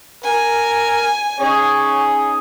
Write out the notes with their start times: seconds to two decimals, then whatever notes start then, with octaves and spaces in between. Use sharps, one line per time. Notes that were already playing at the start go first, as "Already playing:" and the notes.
0.24 A#4 G#5
1.40 C#4 D#4 G#4 C#5